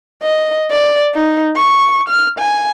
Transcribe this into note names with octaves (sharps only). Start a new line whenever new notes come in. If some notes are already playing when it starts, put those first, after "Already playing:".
D#5
D5
D#4
C#6
F6
G#5